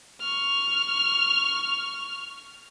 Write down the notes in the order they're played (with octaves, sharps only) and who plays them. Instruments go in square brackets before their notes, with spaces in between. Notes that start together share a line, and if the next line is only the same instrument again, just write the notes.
[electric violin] C#6 F6